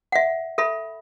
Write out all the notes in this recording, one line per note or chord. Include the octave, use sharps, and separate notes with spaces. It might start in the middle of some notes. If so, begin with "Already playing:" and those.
E5 F#5
A4 E5 B5